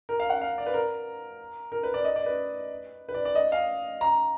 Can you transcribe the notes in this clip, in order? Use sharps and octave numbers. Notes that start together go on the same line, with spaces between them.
A#4
F5
F#5
F5
D5
B4
A#4
A#4
B4
D5
D#5
D5
B4
B4
D5
D5
D#5
F5
A#5